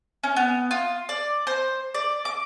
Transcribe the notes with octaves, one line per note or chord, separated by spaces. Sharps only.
C#4
B3
F4
D5
C5
D5
D6